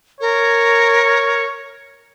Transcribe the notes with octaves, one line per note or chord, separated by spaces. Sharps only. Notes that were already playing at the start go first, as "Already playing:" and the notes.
A#4 C#5